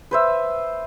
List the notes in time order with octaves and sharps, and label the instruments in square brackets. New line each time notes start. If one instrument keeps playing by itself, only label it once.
[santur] B4 C5 E5